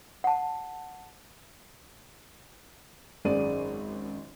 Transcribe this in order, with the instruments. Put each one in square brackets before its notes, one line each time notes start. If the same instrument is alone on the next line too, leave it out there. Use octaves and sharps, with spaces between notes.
[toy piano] F#5 A5
[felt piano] G#1 F#2 G#4 D5 D#7